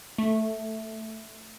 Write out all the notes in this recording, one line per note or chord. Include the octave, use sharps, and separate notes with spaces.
A3